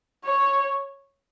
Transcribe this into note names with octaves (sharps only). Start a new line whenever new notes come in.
C#5